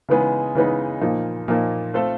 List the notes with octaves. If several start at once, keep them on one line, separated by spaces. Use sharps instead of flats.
C#3 E3 G#3 B3 D#4
C#3 E3 G#3 B3 D#4
A#2 F3 A#3 D#4
A#2 F3 A#3 D#4
A3 C4 F4 A4